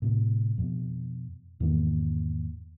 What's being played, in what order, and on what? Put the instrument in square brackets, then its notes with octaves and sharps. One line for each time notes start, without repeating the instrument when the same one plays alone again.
[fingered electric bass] A2 C3
F2 B2
E2 G#2 D#3 A#3